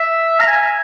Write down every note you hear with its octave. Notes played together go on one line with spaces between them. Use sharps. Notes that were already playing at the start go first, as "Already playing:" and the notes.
Already playing: E5
A#5
G#5